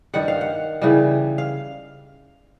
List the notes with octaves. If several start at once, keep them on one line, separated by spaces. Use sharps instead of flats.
G2 D#3 G3 F#5
F5
F#5
C#3 E3 G3
F5